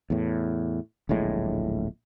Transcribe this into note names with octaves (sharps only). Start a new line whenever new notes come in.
E2 A2
D1 A#1 A2 G#3